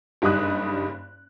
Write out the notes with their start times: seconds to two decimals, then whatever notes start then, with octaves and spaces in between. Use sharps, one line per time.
0.22 F#1 G2 G3 D#4 D#6 F#6